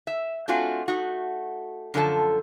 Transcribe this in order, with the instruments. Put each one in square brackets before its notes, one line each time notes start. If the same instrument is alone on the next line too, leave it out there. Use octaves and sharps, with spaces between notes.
[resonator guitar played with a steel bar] E5
A3 C4 D4 F4 F#4 G#5
A3 D#4 F#4
F#2 D3 F3 F4 A4 A5